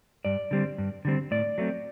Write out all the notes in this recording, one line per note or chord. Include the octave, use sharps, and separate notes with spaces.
G2 D5
D3 G3 C4
G2
D3 G3 C4
A2 D5
F#3 A3 C4